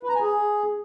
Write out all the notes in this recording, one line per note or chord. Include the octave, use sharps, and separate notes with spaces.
B4
A#5
G#5
G#4